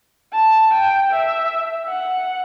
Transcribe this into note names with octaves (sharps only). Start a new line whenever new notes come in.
A5
G5
E5
F#5